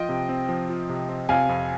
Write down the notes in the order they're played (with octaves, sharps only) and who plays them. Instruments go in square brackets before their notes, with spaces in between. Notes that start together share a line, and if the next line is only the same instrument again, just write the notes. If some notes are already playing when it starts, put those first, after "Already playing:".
Already playing: [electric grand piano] F3 F4 [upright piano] D#5 G5
[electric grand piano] C3
C4
F3
F4
C3
C4
[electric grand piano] C3 [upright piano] F5 G#5
[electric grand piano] F2